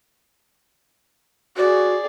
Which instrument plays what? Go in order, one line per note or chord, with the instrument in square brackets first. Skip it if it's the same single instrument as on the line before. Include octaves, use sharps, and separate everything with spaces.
[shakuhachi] F#4 [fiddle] G#4 D5